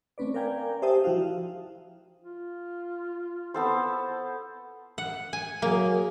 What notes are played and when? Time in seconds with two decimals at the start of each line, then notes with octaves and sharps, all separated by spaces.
0.18 A3 C4 C#4 B4 D5
0.34 A#4 D5 F5 G5 G#5 A#5
0.82 G4 C5 E5 G5 A5 D#6
1.04 F3 E4 F#4 F5
2.22 F4
3.54 B3 A4 C5
4.98 F#5
5.33 G#5
5.62 F#3 A#3 G#4